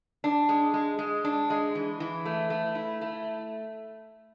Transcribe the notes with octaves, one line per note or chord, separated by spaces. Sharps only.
D4
G#3
G#3
G#3
D4
G#3
E3
E3
A3
A3
E4
A3